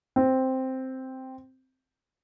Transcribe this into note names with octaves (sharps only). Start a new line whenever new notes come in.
C4